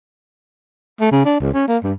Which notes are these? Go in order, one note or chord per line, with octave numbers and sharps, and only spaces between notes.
A3
C#3
D4
C#2
C#4
A#3
G2